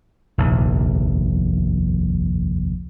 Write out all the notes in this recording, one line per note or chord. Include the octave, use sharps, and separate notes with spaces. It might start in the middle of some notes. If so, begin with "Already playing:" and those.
F1 A#1 D#2